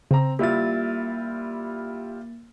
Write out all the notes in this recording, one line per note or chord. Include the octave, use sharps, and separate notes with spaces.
C#3 C4 A#5
G3 A#3 E4 F4 A6